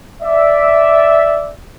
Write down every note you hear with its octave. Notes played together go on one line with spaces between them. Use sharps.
D5 E5